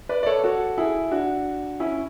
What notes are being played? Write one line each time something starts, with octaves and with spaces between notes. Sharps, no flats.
B4 D5
D5
A4 C#5
F#4 A4
E4 G#4
D4 F#4
C#4 E4